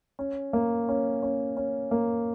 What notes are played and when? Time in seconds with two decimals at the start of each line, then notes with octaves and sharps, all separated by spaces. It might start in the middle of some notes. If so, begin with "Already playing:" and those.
0.19 C#4
0.53 A#3
0.89 C#4
1.23 C#4
1.57 C#4
1.91 A#3